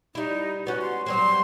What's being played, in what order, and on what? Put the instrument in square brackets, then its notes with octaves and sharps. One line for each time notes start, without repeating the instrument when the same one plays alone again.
[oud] G3 E4 [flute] D#4
[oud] B3 C#4 [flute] F#4
[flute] C6
[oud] F#3 G3 C4 [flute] C6